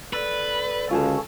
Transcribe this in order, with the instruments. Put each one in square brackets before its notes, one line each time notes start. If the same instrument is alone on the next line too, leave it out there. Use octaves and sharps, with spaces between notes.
[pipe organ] A4 D5 [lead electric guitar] B4
[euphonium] C#2 [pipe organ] D3 C#4 F#4 [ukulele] F4 G#4 A4